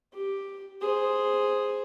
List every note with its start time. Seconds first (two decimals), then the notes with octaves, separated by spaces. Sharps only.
0.13 G4
0.81 G#4 C5